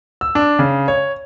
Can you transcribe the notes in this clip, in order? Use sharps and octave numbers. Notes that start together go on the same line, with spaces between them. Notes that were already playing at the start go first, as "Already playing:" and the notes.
E6
D4
C#3
C#5